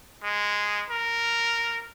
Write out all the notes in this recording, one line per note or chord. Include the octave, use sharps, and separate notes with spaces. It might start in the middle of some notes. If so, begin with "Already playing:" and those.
G#3
A#4